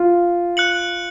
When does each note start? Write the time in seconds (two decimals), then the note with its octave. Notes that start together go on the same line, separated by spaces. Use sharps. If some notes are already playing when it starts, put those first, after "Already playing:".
Already playing: F4
0.57 F#6 C#7 F#7